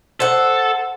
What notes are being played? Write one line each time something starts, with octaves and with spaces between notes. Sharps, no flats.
A4 C5 F#5